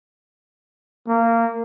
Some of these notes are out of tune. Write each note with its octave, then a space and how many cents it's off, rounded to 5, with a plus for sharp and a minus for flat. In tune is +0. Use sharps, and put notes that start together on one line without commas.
A#3 -20